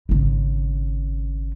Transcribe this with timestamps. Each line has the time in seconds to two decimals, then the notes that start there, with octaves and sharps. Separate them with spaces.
0.09 G#1 C#3